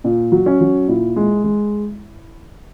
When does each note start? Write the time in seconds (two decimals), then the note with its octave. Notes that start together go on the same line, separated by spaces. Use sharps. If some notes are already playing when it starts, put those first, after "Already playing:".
0.04 A#2
0.32 F#3
0.46 C#4
0.61 F#3
0.88 A#2 E4
1.16 G#3
1.44 G#3